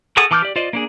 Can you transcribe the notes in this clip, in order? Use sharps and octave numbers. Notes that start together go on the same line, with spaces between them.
F#4 G#4 A4 F#5 D#6
E3 A5 D6 F6 G6
G4 D5
F4 C5 D5 D#5
A#3 D4 G#4